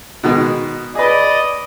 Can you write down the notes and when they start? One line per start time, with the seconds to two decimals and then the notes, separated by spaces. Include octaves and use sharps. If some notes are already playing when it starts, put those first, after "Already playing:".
0.23 B2 D#3 G#3
0.95 G#4 B4 D5 D#5